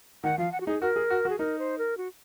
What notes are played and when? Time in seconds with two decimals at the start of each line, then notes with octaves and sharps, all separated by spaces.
0.24 D#3 F#5
0.38 F3 F5
0.52 F#5
0.61 F#4
0.67 D#4 G#4
0.81 F#4 A#4
0.96 G#4
1.10 F#4
1.25 F#4
1.29 G#4
1.39 D#4 A#4
1.59 C5
1.78 A#4
1.97 F#4